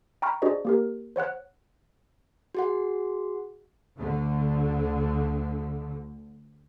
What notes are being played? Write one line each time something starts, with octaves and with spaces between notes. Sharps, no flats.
G5 A#5 B5 C#6 F6
D4 F#4 G#4 C5 D5 D#5
A#3 G4 A#4
C5 C#5 F#5 F#6
F#4 G#4 F#5
D2 D3